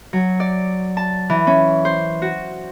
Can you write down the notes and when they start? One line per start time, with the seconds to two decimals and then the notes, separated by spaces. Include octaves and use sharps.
0.13 F#3
0.40 D5
0.97 A5
1.30 E3
1.47 C#4
1.85 C5
2.22 F#4